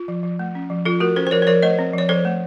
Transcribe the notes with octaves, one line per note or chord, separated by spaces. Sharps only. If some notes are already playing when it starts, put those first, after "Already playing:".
Already playing: F4
F3
F3
A3
C#4
F3
F3 F4 A4
A3 F#4 A#4
C#4 A4 C5
C5
F3 A#4 C#5
C5
F3 A#4 C#5
A3 C5 D#5
C4
F3 C#5
F3 A4 C5
A3